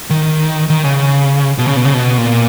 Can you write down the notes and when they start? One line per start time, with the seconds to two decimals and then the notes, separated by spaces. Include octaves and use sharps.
0.10 D#3
0.70 D#3
0.84 C#3
1.58 B2
1.67 C#3
1.76 B2
1.85 C#3
1.94 B2
2.18 A#2